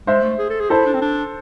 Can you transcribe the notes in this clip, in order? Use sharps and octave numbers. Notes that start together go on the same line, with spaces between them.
G#3 C5 E5
A3
G#4
A4
G#4
E4 A4 C5
D4
C4
D4